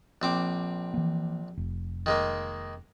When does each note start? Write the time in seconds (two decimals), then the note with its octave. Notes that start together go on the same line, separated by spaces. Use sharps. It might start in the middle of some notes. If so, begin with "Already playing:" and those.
0.22 A#1 C4 D6
0.94 E3 A#3
1.57 F1
2.06 D#3 G#3 A#3